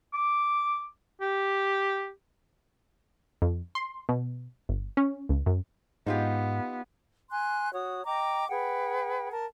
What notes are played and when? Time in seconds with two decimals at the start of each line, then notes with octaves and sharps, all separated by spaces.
0.14 D6
1.21 G4
3.42 F2
3.75 C6
4.09 B2
4.69 G1
4.97 C#4
5.29 C#2
5.46 F#2
6.07 G#2 B3 D#4 F4 G4
7.30 G#5 C6 F#6
7.73 F#4 C#5 D#6
8.05 D#5 G5 A#5 D6
8.49 G#4 B4 F#5 G5
9.31 A#4 A5